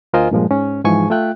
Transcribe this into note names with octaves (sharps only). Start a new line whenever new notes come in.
D2 F4 A#4 C5 D#5 G#5
G2 A#2 F3 G#3
G#2 C#4
G#2 E3 F3 G#5 C#6
A3 F4 E5 G5 F#6